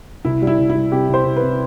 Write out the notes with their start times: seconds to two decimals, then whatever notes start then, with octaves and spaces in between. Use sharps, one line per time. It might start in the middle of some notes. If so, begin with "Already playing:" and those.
0.25 C2 E4
0.42 G3
0.47 E4
0.58 C2
0.70 E4
0.75 G3
0.92 C3 G4
1.09 C2 C5
1.25 C2
1.36 B4
1.42 C3